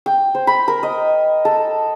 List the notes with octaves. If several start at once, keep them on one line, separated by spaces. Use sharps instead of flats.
G5
C5
B5
A#4
D#5
A4